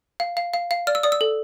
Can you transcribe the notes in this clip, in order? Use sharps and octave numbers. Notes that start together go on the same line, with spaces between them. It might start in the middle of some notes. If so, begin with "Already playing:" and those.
F5
F5
F5
F5
D5 F6
E6
D5 D#6
E6
A4